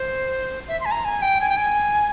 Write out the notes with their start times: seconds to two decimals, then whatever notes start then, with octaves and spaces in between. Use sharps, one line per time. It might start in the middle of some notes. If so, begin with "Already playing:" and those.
Already playing: C5
0.68 E5
0.80 C6
0.85 G#5
0.91 A#5
1.05 G#5
1.22 G5
1.40 G#5
1.49 G5
1.57 G#5